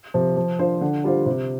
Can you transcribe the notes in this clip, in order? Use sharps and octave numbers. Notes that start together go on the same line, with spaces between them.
C3 F3
F3
D4 F4 C5
D3
G3 F4 C5
C3